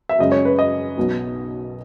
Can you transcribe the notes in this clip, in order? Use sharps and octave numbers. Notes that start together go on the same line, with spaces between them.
E5
F#2 C#3 G#3 C#4 D#5
C#5
B4
D#5
B1 B2 F#3